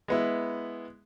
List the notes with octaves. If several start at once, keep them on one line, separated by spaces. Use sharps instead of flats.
G#3 B3 E4